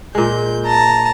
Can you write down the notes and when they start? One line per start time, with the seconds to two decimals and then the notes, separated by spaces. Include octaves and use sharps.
0.15 A#2 G#3 G6
0.66 A5 A#5